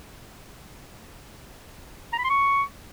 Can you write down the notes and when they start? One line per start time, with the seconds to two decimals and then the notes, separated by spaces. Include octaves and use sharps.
2.13 A#5
2.18 B5
2.24 C6
2.30 C#6